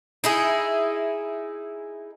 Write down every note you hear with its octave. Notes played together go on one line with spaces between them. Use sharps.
D#4 E4 G#4